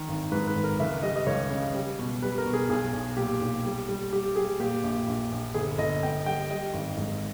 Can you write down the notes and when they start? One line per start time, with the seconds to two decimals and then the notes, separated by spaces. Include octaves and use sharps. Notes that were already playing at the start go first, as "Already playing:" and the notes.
Already playing: D#3
0.08 G#1
0.32 G#2 B4
0.47 B4
0.55 G#1
0.64 A#4
0.80 C#2 E5
1.03 G3 D#5
1.16 D#5
1.27 C#2 C#5
1.50 C#3
1.74 G3
1.99 B2
2.22 G3 B4
2.38 A#4
2.46 B2
2.53 G#4
2.69 B1 G#4
2.93 B1
3.17 A#2 G4
3.41 B1
3.64 G3
3.88 G3
4.13 G3 G4
4.36 G3 G#4
4.59 A#2 G4
4.83 A#1
5.08 A#1
5.32 A#1
5.54 G1 G#4
5.78 G1 D#5
6.02 G1 G5
6.26 G3 G5
6.50 G3 D#5
6.74 G#1
6.97 G#2